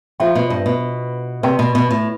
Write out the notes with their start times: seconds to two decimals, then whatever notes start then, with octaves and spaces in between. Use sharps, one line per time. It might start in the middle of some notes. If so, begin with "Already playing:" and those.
0.20 F3 F4 C5 E5 G5 C6
0.35 B2
0.50 G2
0.66 B2
1.43 C3 B4 D5 G5 C6
1.59 B2
1.75 B2
1.91 A2